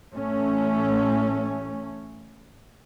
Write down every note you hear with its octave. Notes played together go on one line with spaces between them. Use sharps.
A1 A3 C#4